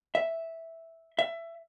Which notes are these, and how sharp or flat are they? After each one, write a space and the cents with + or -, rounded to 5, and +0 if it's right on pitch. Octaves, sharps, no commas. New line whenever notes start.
E5 -5
E5 +20